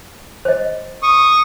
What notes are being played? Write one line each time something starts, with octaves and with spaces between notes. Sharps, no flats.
C5 D#5
C#6 D#6